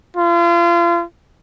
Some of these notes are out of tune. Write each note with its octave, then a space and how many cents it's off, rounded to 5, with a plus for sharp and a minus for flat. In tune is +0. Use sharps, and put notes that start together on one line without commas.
F4 -35